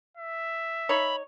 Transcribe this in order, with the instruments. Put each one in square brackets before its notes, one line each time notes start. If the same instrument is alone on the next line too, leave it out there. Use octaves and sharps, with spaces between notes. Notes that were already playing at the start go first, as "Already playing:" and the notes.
[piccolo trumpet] E5
[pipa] D#4 C#5 [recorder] B5